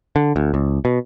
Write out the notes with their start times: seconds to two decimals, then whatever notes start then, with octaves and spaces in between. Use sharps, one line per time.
0.16 D3
0.36 D2
0.54 C#2
0.85 B2